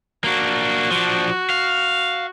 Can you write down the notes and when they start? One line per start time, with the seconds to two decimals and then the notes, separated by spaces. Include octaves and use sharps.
0.24 A#3 D4 F#4
0.91 F3 D4
1.50 F5